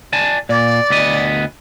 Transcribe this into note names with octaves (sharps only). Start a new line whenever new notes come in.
D5 G#5 A5
A#2 D5
D2 B3 D#5